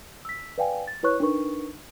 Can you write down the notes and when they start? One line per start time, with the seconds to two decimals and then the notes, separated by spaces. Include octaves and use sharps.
0.25 E6 B6
0.58 B4 D5 F5 G5 G#5
0.88 A6
1.03 E4 B4 C#5 C#6 F#6
1.20 D4 D#4 A#4 B4 C#6